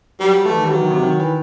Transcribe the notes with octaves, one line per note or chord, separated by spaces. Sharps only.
F#3 G3
F#3
E3 A3
D#3
G3
E3 F#3
D#3
C3
D#3
E3